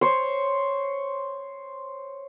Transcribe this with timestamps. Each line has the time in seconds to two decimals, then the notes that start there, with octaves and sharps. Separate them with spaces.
0.01 C5 C#5